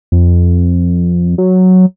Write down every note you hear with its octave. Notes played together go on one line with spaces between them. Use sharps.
F2
F#3